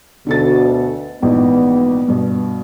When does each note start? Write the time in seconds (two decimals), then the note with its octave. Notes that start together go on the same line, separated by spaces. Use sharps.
0.27 D2 B2 D3 A4 A6
1.22 A#1 G#2 E3 B3
2.08 G2 B2